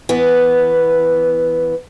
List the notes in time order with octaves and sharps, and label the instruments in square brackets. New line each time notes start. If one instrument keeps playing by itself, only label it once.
[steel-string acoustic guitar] E3 B3